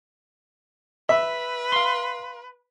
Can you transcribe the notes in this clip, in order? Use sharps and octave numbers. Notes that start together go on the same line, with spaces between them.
B4 E5
F5 C6